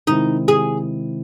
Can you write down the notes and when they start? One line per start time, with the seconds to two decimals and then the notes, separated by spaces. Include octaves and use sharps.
0.07 C3 D#3 G#3 C4 D#4 E4
0.48 G#4